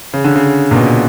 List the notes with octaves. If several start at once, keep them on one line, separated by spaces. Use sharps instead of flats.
C#3
D3
C#3
A#2
B2